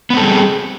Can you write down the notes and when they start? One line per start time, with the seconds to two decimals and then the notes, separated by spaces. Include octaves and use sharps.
0.10 B3
0.14 C4
0.17 A4
0.20 G3
0.24 G#4